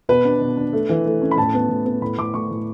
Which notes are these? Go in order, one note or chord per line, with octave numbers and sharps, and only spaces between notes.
B2 B4
D4
B2
D4
A3
E3
A3
C#4
B5
A2 A5
B3
A2
B3
A2 B5
A2 D6
A2 C#6
A2